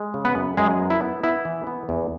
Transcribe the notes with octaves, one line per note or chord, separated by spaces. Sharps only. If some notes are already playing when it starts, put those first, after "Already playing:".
Already playing: G#3
C#3
B3 B4
F#2
F#2 G#3 G#4
B3
E4
B3
B3 E4
E3
B3
E2